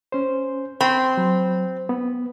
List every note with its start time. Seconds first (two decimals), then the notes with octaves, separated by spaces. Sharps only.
0.12 C#4 C5
0.81 C4 B5 C6
1.17 F#3
1.89 B3